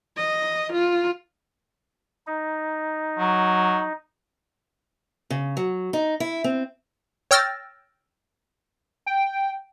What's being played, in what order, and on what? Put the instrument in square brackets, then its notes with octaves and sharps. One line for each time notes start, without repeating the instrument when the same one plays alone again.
[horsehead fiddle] D#5
F4
[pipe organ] D#4
[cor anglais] F#3
[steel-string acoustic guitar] C#3
F#3
D#4
E4
C4
[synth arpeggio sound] C#5 G5 E6 F6 A6 A#6
[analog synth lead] G5